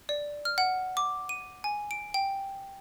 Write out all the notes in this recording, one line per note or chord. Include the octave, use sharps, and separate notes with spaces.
D5
F6
F#5
D6
D#7
G#5
D7
G5